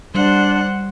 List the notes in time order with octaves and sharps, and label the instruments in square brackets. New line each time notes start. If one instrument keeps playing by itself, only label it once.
[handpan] G3 [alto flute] D4 [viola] C5 F#5